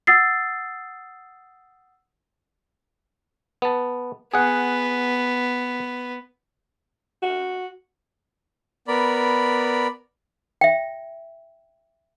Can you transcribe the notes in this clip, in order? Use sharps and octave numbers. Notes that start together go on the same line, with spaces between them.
F#5 D#6 E6 A6 C7
B3 A5
B3 G#4 F#5
F#4
B3 A#4 D5 B5
E5 G5